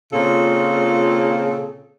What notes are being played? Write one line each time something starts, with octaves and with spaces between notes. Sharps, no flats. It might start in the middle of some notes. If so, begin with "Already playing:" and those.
A#2 C#3 C4 F4 A4